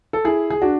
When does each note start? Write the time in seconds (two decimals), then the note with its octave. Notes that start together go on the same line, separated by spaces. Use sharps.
0.13 A4
0.24 E4 G#4
0.50 G#4
0.62 D4 F#4